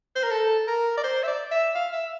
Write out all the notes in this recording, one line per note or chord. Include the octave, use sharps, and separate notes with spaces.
C5
A#4
A4
A#4
D5
C5
E5
D5
E5
F5
E5